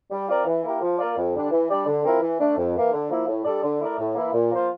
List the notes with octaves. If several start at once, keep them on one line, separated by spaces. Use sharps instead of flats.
G3
C4 F4 A#4 D5
E3
A#3 E4 G4 A#4
F3
A#3 F4 A#4 D5
F2
D3 G3 D4
E3
G3 D4 G4 D5
D3
F3 C4 E4 A#4
E3
A3 D4
F2
E3 A#3
D3
F3 A#3 E4
A2
G3 D4 A4 D5
D3
A3 E4 A#4 D5
A2
E3 A#3 E4
A#2
F3 A#3 F4 C5